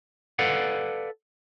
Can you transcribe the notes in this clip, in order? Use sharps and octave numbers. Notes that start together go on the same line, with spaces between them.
A4 B4 D5 F5 F#5